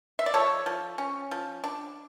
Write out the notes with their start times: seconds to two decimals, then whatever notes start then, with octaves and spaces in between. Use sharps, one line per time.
0.19 E5
0.26 D5
0.34 F3 A4 C#5
0.66 F3
0.98 C#4
1.31 F3
1.64 D4